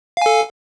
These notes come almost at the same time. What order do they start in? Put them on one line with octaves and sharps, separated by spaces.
F5 G#5 A4